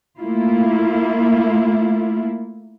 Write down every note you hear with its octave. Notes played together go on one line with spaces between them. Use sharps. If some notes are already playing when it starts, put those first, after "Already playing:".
A3 A#3 E4 F4